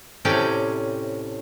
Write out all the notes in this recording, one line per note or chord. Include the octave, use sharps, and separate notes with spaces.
A2 C3 C#4 D5 G5